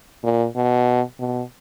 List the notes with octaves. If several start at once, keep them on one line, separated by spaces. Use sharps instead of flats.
A#2
B2
B2